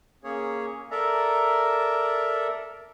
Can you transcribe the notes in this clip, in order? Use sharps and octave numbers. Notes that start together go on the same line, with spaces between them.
A#3 C#4 G#4 C#5
A4 A#4 D5 E5 A#5